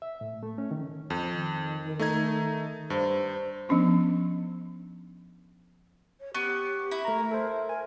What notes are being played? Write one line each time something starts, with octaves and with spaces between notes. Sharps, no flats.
E5
A2
A3
C#4
D#3
F2
D#3
A3 D#4 G#6
G2 C5
F3 B3 C#4 D4
C#5
B3 G4 C#6
E4
A3 A#4 A#5
A4 C5
A#4 G#5